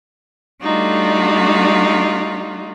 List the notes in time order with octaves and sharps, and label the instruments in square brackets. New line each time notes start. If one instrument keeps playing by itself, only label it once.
[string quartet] G3 A3 D4 D#4 F4 F#4